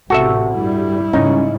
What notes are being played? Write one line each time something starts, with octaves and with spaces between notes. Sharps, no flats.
A1 A2 C3 F#4 A4 E5
G2 G3 E4
G#2 C#3 G3 C#4 D#4